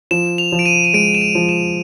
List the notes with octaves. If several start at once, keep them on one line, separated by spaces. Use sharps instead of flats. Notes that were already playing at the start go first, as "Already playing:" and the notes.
F3 E7
F7
F3
D7
D#7
D#7
G#3 D7
E7
D#7
F3
E7